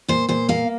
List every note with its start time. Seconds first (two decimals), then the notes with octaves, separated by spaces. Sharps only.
0.08 A#2 C5
0.29 A#2 C5
0.49 A#3 F5